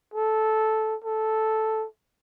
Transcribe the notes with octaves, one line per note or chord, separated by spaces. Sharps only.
A4
A4